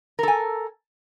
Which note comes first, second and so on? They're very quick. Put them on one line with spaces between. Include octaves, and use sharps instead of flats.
A#4 A4 G#5